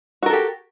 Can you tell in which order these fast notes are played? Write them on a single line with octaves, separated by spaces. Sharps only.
F#4 A#4 A4 G4